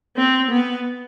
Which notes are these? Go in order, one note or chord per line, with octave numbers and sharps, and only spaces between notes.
C4
B3